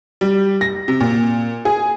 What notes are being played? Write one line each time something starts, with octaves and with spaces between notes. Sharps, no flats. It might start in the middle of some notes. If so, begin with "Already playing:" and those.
G3
A#6
C3
A#2
G#4